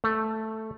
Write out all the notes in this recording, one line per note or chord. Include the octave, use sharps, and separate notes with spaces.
A3